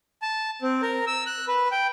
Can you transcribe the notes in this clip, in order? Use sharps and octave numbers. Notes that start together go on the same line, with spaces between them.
A5
C4
A#4
E6
F#6
B4
G5